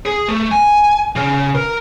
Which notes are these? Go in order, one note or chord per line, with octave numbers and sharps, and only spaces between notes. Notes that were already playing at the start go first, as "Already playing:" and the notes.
G#4
A3
G#5
C#3
A#4